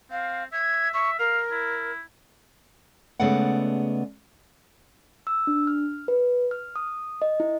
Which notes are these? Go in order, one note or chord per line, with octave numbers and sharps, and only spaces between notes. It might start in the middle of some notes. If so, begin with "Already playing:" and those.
C4 F5
E5 G#6
E5 C#6
A#4 F5
E4
C#3 G#3 A3 B3 D5 F#5
E6
D4
F6
B4
F6
D#6
D#5
E4